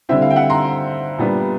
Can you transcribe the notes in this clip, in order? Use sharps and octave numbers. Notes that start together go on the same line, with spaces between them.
D3 G3 C4 E4 E5
F5
G5
E5 F#5
A#5 C6
A#2 G3 B3 D4